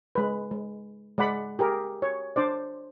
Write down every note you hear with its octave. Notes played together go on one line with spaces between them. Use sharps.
G#3 B4
G#3
G#3 D5 F#5 B5
G4 G#4 A#4
C#5
D4 C5 D5